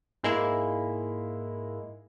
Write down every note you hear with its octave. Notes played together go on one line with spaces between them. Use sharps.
G#2 G#3 A#3 E4